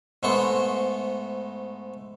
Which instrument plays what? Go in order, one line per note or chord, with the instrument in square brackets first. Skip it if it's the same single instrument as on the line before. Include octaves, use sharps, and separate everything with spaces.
[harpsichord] G#2 G#3 A3 B3 C5 C#6